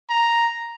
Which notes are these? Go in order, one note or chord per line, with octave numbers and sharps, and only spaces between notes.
A#5